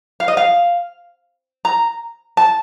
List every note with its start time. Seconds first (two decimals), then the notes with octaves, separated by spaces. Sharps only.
0.20 F5
0.28 D#5
0.37 F5
1.65 A#5
2.37 A5